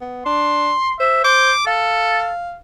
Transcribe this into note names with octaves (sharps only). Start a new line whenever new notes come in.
B3
D4 C6
C5 E5
C5 D6
A4 F5